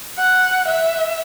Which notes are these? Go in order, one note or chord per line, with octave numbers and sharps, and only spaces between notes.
F#5
E5